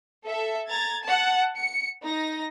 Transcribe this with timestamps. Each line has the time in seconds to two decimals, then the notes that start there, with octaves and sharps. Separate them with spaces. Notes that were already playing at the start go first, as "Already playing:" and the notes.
0.24 A4 E5
0.69 A#5 G#6 A6
1.05 F#5 A5
1.58 C#7
2.05 D#4 A#6